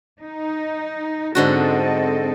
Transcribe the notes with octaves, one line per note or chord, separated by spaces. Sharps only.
D#4
G#2 D3 C4 F#4 A4 D#5